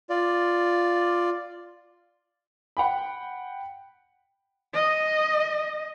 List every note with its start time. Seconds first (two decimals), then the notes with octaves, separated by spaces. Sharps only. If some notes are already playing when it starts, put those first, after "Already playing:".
0.10 F4 D5
2.77 F#5 G5 B5
4.74 D#5